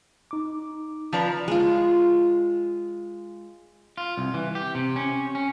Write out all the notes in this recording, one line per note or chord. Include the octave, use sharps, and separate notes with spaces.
D#4 D6
F3 F4 B4 D5 A#5
G#3 F4
F4
C2
E3
G4
C3
C#4
C#4